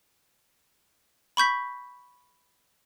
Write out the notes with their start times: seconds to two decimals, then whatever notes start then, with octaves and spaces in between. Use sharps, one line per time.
1.37 B5 C#6 G6 B6